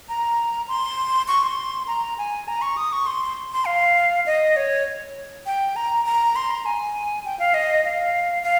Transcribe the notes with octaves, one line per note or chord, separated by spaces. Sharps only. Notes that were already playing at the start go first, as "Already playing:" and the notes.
A#5
C6
C#6
C6
A#5
G#5
A#5
C#6
D#6
C#6
C6
C6
F5
D#5
C#5
G5
A#5
A#5
C6
A#5
G#5
G5
F5
D#5
F5
F5